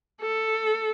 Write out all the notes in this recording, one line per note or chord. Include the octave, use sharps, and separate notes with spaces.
A4